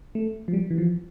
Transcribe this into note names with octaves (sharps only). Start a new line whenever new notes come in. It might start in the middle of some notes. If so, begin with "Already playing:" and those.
A3
F3
G3
E3
F3